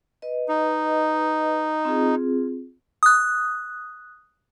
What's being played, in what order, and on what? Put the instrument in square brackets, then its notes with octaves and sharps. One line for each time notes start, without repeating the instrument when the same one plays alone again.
[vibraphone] B4 D#5
[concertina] D#4
[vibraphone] C4 F4 G#4
[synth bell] D#6 F#6